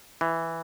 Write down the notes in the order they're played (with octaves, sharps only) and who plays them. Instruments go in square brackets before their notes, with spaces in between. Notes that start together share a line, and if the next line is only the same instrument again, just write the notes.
[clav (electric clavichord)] E3